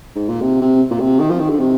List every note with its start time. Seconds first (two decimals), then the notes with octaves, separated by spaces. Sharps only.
0.15 G#2
0.29 A#2
0.41 C3
0.61 C3
0.91 A#2
1.00 C3
1.20 D#3
1.30 F3
1.40 D#3
1.50 D3
1.59 C3